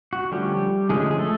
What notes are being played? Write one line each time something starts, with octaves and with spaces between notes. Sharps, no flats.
F#4
D3 F3 G3 A3 C#4 G4
D3 F3 G#3 A3 C#4 G#4
G#4
A3 A4